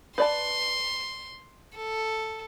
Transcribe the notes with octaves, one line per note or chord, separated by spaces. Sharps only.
B4 D5 A5 C6
A4